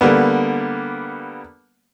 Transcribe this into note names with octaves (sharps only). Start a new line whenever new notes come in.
D3 G3 A#3 B3